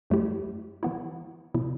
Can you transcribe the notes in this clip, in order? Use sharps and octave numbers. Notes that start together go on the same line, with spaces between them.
F#2 F#3 A3 E4 G4
E3 B3 E4
C3 E3 B3 E4